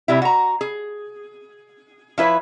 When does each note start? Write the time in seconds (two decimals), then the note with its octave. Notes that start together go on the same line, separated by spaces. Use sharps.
0.08 C3 G3 E4
0.22 F#4 A#5
0.61 G#4
2.18 F3 E4 B4 C#5